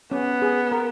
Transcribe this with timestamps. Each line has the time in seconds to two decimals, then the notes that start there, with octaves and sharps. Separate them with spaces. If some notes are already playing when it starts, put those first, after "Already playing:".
0.11 B3 C#4
0.42 G#4
0.72 A#4